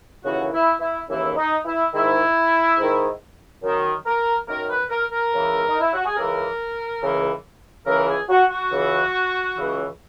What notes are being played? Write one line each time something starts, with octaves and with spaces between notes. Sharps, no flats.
D#2 C#3 E3 F#4
E4
E4
D#2 C#3 E3 E4
D#4
E4
G#2 D#3 E4
G#2
D#3
F#2 D#3
A#4
F#2 D#3 A#4
B4
A#4
A#4
C#2 C#3 E3
D#4
E4
F#4
G#4
C#2 C#3 E3 A#4
C#2 C#3 E3
C#2 C#3 E3 A#4
G#4
F#4
F#4
C#2 C#3 E3
C#2 C#3 E3